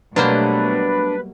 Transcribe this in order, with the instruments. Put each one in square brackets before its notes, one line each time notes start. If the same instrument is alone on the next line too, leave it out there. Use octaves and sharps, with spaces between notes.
[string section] B2 G3 A3 [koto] F#3 A#3 C5 [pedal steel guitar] D4 [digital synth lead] B4